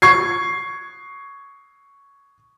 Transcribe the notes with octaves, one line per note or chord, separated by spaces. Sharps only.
C#6 G#6 C7